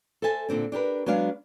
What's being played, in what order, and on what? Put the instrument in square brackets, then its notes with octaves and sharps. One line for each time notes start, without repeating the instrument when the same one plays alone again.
[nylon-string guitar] A4 C5 E5 G#5 A5
A#2 D3 C4 D4
D4 G4 A#4 B4
F#3 G#3 B3 D4 G#4 F5